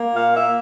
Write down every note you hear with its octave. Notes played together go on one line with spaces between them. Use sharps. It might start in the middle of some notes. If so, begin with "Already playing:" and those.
Already playing: A#3
A#2 F5
A#3 E5